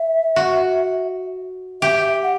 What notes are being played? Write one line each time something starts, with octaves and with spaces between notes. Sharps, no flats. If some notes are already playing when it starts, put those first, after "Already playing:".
Already playing: E5
F#4
G4 E5
F#5